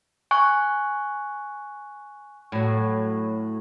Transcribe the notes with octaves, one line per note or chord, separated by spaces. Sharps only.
G#5 C#6 F#6
A2 F#3